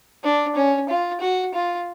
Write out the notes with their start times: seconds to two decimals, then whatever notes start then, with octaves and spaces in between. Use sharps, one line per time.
0.24 D4
0.55 C#4
0.89 F4
1.21 F#4
1.54 F4